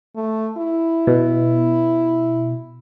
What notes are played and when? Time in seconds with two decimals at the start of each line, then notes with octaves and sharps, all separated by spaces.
0.16 A3
0.58 E4
1.07 B2